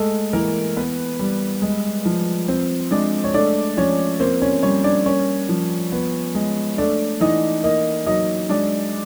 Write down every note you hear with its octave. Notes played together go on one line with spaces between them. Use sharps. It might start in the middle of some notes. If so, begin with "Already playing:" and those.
Already playing: G#3 A3 A4
E3 A#3 A#4
B3 B4
G3
G#3
F3
C4 C5
G#3 D4 D5
C#5
A3 D4 D5
F3 C#4 C#5
A#3 C4 C5
C#4 C#5
G3 C#4 C#5
D4 D5
A#3 C#4 C#5
F3
B3
G#3
A3 D4 D5
E3 D#4 D#5
A#3 D#4 D#5
F#3 D#4 D#5
G#3 D4 D5